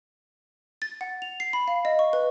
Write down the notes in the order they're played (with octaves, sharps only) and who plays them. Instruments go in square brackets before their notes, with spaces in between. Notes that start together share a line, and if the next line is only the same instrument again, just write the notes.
[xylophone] A6
F#5
F7
C7
B5
F5
D#5
C#6
B4